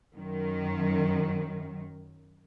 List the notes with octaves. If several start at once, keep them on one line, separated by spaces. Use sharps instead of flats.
F#2 D#3